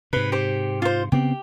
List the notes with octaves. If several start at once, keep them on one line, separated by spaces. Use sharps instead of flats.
G#2 C3 B4
G4 C5
F4 C5
C#3 B3 C4 G4